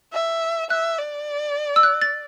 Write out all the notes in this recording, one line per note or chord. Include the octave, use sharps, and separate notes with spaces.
E5
E5 F#6
D5
E6
F#6
A6